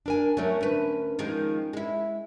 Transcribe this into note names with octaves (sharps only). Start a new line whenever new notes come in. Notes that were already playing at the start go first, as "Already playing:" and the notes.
D4 A#4 G#5
F#3 A3 C#4 A#4
D2 B4
D#3 F3 G#3
G#3 E4